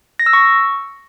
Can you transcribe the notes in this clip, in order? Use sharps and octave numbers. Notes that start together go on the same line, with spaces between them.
A#6
E6
C#6